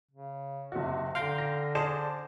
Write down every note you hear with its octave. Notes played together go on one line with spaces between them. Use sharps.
C#3
F#1 C3 F#4
D3 F5 G5 A#5 C6
A#6
G#4 C5 D5 A5 E7